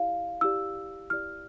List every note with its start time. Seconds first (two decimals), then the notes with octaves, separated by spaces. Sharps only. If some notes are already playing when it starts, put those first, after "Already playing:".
Already playing: E4 G4 D5 F5
0.41 E4 G4 D5 E6
1.10 E4 G4 D5 F6